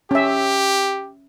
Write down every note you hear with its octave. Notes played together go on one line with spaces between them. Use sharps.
C#4 G4 E5